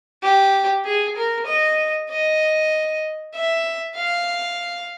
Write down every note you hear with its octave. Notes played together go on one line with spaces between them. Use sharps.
G4
G#4
A#4
D#5
D#5
E5
F5